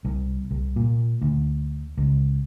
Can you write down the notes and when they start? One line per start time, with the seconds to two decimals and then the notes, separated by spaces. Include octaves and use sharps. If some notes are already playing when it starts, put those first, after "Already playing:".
0.05 C2
0.51 C2
0.76 A#2
1.22 D2
1.98 C#2